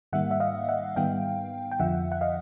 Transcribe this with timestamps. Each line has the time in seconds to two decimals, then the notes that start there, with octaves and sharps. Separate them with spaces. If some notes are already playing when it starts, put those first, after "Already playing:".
0.13 G#2 D#3 G3 A#3 E5 F#5
0.31 E5
0.40 D#5 F5
0.69 E5 F#5
0.96 G#2 D#3 G3 B3 F5 G5
1.71 G5
1.79 F2 D3 F3 E5 F#5
2.12 F#5
2.21 D#5 F5